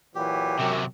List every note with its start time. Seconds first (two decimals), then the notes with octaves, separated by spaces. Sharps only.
0.15 A#2 E3 F#3 G4
0.59 F#2 C3 F#3